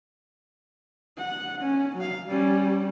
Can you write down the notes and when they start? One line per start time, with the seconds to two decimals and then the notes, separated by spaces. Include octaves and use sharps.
1.18 F#5
1.62 C#4
1.96 F#3 F5
2.27 G3 C#4